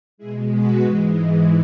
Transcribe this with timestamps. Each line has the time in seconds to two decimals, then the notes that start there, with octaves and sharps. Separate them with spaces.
0.18 B2 G#3 E4 G#4
0.48 F#4 B4
0.80 G#2 E3 G#3